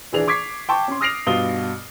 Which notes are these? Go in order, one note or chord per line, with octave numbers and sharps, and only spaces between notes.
D#1 E3 D4 G#4 F7
C#6 D6 G#6 B6 C7
G5 A5 C#6
C#4 C6
D#6 F6 A#6 C7 D7 F7
G2 B2 B3 F4 D#6 G7